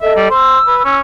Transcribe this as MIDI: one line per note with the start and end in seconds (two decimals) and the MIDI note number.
0.01 0.28 69
0.01 0.28 75
0.01 0.13 76
0.16 0.30 55
0.30 0.58 72
0.30 0.99 88
0.67 0.80 71
0.85 1.00 61